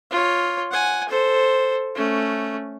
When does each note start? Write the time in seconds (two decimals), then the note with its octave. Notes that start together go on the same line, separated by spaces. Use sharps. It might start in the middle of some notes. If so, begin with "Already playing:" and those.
0.11 F4 C#5
0.71 F#5 G#5
1.09 A4 C5
1.95 A3 C#4